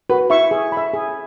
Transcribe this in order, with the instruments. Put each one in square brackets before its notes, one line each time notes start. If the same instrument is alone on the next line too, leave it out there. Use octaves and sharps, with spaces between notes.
[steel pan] F#4 [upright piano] B4
[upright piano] E4 [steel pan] E5 C#6
[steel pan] G#4
B5
E5
G#4